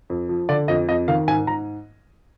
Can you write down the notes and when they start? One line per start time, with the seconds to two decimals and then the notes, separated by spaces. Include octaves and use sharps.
0.10 F2
0.29 F3
0.49 D3 D5
0.68 F2 D#5
0.88 F2 D#5
1.08 D#3 F5
1.27 G#2 G#5
1.47 G#2 A#5